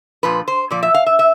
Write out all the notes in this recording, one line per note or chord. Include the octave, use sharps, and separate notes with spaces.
A#2 F3 B4
C5
A#2 F3 D5
E5
F5
E5
E5